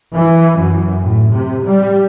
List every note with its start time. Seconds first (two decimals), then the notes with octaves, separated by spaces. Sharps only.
0.13 E3
0.55 F#2
1.01 A2
1.32 C3
1.64 G3